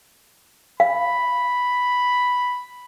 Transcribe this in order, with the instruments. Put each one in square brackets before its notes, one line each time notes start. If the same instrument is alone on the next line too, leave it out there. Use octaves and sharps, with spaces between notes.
[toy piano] F5 [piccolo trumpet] B5